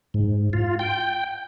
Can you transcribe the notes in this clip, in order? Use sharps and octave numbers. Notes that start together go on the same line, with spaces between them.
G#2
F4
G5